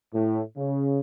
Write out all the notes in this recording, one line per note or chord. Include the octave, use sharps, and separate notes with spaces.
A2
C#3